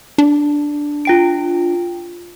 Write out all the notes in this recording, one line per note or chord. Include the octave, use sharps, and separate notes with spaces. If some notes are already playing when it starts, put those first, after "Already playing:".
D4
F4 G5 D7